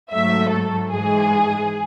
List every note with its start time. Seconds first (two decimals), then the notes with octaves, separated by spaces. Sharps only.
0.11 G#2 F#3 A3 E5
0.51 A4
0.92 G#2 E3 G#3 G#4